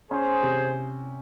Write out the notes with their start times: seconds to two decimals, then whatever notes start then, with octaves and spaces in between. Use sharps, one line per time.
0.10 C#4 G#4 C5
0.43 C3